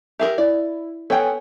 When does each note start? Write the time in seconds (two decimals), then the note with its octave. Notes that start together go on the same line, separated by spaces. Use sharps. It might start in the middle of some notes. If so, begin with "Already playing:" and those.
0.19 G4 G#4 A#4 E5
0.38 E4 D5
1.10 B3 A4 C#5 G5 G#5